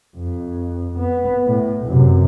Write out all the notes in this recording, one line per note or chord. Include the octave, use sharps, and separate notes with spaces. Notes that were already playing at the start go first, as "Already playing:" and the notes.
F2
B3
A2
F#2 C3